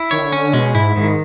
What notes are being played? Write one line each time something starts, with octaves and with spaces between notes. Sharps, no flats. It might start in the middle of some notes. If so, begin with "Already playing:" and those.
Already playing: E4
D#3 C#5
D3
C#4
B2 G#3
G#2 E4
G#2 D#3